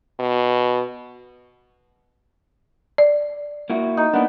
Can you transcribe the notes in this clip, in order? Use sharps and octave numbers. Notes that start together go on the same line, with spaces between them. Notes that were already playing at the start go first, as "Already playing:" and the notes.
B2
D5
A#3 E4 F#4
D#4
A#3 B3 D4